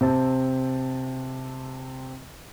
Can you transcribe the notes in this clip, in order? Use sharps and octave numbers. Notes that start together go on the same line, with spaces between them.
C3 C4 A5